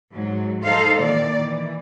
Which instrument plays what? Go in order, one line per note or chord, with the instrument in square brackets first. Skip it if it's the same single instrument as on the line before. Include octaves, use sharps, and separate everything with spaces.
[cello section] G#2 F#3
D#4 A4 C5 F5
A#2 D#3 E3 D5
E3